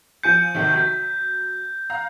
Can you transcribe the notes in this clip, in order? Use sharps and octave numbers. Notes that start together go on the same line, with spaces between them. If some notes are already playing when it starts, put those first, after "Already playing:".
F3 G#5 G6 C#7
B1 C3 D#3
F#3 G6 B6
F5 A#5